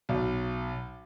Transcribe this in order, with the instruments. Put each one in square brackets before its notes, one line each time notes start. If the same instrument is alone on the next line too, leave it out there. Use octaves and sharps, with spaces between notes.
[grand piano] B1